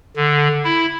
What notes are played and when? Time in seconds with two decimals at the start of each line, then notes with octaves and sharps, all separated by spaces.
0.16 D3
0.65 E4